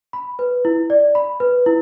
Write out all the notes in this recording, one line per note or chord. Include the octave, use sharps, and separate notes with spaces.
B5
B4
E4
D5
B5
B4
E4